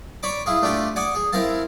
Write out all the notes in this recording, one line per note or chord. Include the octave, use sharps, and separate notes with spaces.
C#5 D5 B5 D6
E4 F4 G#4
A3 D4 F4 G4 A4
D5 F#5 G#5 D6 D#6
G#4
C4 E4 A#4 F5 A5